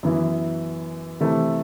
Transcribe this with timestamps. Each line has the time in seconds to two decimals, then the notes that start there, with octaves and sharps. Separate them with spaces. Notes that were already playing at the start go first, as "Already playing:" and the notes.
0.03 F#2 E3 B3 E4
1.20 C3 E3 A3 E4